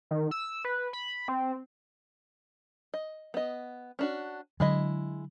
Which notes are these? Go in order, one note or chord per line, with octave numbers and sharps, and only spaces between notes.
D#3
E6
B4
B5
C4
D#5
B3 D#5
C#4 D4 F#4
D3 F#3 G#3 E4 D#5